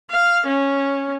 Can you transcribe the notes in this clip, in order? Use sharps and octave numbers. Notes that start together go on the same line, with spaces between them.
F5
C#4